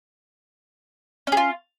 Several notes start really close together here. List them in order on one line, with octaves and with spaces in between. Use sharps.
C#4 G#4 F4